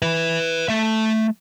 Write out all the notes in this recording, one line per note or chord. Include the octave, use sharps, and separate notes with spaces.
B4 E5
A3 E5